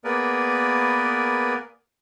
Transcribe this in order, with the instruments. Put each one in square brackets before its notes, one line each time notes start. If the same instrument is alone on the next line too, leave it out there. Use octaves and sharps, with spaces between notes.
[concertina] A#3 B3 G#4 A#4 B4 D5